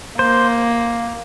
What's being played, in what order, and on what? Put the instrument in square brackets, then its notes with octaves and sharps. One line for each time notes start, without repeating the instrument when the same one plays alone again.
[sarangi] A#3 [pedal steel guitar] C5